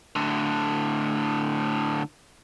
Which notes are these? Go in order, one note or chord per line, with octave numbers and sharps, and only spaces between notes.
A2 D3